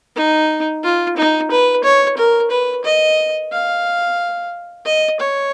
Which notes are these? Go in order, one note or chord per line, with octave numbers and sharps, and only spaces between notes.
D#4
F4
D#4
B4
C#5
A#4
B4
D#5
F5
D#5
C#5